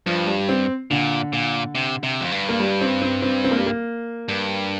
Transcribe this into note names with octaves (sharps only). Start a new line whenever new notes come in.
G2 F3
G3
C4
A#2 D3
A#2
C3
C3
F2
G2
A#3
G3
C4
C4
C4
C4
A#3
G3
A#3
G2